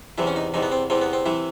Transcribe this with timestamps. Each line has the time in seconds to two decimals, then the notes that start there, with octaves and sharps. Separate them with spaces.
0.18 E2 C3 E3 E4
0.27 C#4
0.36 D#4
0.54 E2 C3 E3 D#4
0.63 B3
0.72 C4
0.90 E2 C3 E3 C4
1.02 B3
1.13 C4
1.26 C3 E3 E4